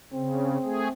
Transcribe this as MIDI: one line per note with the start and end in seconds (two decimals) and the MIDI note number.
0.13 0.57 49
0.13 0.93 60
0.63 0.88 57
0.63 0.88 68